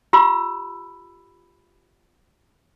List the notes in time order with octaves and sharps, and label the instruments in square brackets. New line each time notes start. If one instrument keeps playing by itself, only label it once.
[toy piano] F4 G4 B5 E6